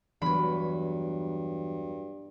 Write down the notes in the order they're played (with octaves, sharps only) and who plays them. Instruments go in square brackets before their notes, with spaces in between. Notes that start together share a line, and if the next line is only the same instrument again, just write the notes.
[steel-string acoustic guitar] E2 F#3 [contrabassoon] G2 [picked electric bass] E3 G3 [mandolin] B5